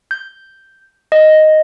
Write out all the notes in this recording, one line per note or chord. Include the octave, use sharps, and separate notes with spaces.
G6
D#5